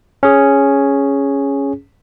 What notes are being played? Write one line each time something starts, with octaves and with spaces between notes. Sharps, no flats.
C#4 G#4